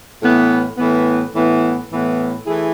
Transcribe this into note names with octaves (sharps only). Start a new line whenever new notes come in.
A2 E3 B3
A2 E3 B3
A2 E3 B3
A2 E3 B3
E3 A3 E4 G#4